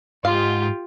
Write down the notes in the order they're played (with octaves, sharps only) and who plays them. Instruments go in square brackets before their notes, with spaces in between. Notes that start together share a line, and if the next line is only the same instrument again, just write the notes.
[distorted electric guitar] G#2 [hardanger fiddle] F4 G4 [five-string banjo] F5